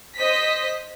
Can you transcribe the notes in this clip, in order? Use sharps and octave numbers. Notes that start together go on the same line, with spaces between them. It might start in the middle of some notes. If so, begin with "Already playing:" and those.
C5 D#5 B6